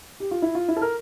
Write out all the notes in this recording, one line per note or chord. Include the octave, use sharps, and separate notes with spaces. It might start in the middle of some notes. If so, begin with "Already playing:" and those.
G4
F4
E4
F4
E4
A4
A#4